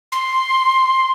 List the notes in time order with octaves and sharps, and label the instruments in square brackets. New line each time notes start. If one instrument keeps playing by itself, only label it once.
[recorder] C6